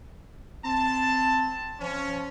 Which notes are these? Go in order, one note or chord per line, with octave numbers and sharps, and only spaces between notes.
C4 A5
F3 C#4